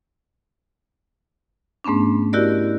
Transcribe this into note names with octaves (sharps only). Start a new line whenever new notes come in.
G#2 A3 B3 C#4 D4
E4 F#4 G4 A#4 D5 D#5